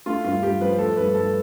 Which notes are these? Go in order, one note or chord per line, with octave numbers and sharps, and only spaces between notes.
A3 F4
G2 F4
G2 G4
F3 B4
A3 A4
G2 B4
G2 A4